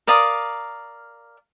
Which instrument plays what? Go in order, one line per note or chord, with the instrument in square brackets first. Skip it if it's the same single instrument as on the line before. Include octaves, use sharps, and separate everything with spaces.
[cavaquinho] A#4 D5 F5 D#6